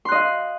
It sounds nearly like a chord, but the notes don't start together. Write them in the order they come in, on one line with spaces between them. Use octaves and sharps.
C6 F#6 D#5 F5